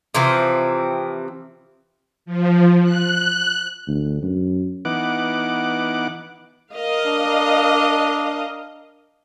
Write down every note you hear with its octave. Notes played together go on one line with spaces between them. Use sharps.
C3 E3 F3 C4
F3
F#6
D2
F#2
E3 B3 D#4 F#5 D6
A#4 D#5 F5
D4